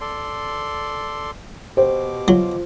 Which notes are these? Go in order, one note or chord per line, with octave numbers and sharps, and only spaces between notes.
A4 D5 C6
B2 G4 C5 D6
F#3 F4